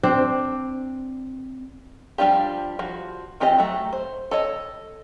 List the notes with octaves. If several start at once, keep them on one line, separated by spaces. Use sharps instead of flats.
C4 D4
F3 G3 D4 F4 G4
F3 F#4
E3 C4 F4 G4 D#5
F#3 A3
C5
A4 C#5 D#5